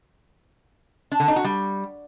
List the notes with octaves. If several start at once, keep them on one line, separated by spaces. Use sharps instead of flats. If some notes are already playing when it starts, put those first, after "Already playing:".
D4
D3
D#4
F#4
G3